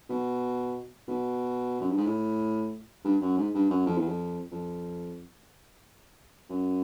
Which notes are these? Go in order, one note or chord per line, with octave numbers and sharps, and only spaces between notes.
B2
B2
F#2
G2
G#2
A2
G2
F#2
G#2
G2
F#2
F2
E2
F2
F2
F#2